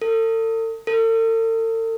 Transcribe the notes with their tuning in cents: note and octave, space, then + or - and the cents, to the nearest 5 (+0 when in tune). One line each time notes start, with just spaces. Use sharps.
A4 +40
A4 +45